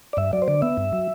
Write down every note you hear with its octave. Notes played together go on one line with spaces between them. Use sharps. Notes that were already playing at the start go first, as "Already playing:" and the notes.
D5
G2 E5
F#3 D5
C5
D3 D5
B3 E5
G2
F#3